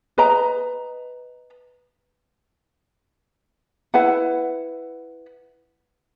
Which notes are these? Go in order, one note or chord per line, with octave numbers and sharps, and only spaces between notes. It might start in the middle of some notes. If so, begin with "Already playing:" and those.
B4 D#5 A#5
E4 B4 F#5